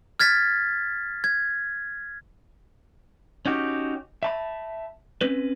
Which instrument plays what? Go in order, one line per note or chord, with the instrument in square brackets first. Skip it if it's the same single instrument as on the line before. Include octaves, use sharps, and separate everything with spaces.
[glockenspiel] F6 G#6 A6 B6
G#6
[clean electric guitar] C#4 D#4 F#4 G4
E5 A5 B5
C4 C#4 B4